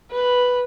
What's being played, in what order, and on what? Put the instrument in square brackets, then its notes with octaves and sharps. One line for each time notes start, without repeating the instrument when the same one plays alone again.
[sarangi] B4